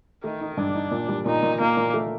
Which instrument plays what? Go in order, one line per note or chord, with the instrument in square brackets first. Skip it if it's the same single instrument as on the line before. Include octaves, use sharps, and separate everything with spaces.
[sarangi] D#3 [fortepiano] A3
[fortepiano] D#4
[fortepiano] G2 [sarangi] D4
[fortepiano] D#4
A#2
G3
[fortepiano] A#2 [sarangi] D#4
[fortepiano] A#2
[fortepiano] A#2 [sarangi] A#3
[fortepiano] A#2
A3